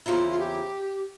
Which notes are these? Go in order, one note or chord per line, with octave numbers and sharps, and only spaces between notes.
E2 C#3 F3 A#3 E4 F4
F4
G4